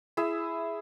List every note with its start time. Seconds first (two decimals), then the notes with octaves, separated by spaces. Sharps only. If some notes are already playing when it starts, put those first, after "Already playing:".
0.17 E4 G#4 E5